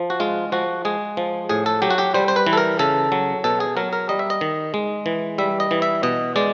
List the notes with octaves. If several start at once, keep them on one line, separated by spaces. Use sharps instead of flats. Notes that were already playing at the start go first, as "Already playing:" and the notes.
Already playing: F3
F#4
G#3 F4
F3 F#4
G#3 G#4
F3
A2 G#4
A4
F#3 G4
F#4
G4
G3 C5
C5
B4
E3
A4
A#4
C#3 A4
F#3
B2 A4
G#4
F#3 A#4
A#4
G3 D#5
E5
D#5
D#3
G#3
E3
G3 E5
D#5
E3
E5
B2 D#5
G#3 D5